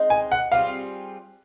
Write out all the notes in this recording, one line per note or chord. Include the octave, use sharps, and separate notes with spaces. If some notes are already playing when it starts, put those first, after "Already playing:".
Already playing: G#3 C4 D#4
G#5
F#5
G3 C4 F4 G#4 F5